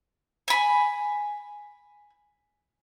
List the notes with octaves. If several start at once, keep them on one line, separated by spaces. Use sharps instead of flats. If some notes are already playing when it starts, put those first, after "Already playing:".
G#5 B5